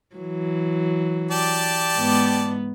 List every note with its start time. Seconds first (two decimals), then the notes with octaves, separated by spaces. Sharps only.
0.16 E3 F#3
1.31 G4 D5 A5
1.97 G#2 B3